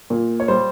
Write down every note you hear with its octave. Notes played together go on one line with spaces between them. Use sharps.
A#2
C#5
G3 C5